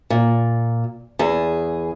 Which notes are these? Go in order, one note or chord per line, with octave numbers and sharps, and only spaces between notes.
A#2
E2 G#4